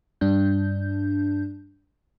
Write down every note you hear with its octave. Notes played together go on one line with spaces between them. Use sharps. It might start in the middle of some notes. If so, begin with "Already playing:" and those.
G2 D4 G6